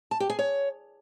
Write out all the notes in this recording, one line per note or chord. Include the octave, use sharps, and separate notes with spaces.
A5
G4
G#4
C#5